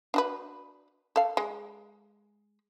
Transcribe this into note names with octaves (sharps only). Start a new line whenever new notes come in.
D4 F#4 B4
A4 F5
G#3